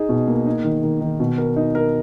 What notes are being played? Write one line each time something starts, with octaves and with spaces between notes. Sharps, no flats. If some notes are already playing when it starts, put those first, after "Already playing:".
Already playing: D#4 G#4
B2
A#3
D#4
D#3
D#3
D#3
B2
A#4
D#4
A#4